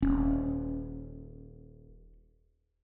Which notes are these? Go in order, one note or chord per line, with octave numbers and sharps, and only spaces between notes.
D#1 C#4